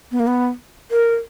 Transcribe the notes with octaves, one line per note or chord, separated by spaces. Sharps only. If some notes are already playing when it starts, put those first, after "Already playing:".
B3
A#3
B3
A#4